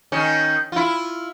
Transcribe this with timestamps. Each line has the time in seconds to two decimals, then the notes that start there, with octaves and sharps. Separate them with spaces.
0.12 D#3 C#4
0.72 E4 F4